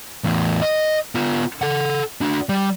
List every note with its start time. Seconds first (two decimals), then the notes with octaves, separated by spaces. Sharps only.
0.24 E2 A2
0.62 D#5
1.15 B3 F4
1.62 A4 F#5
2.21 D4 F#4
2.49 G3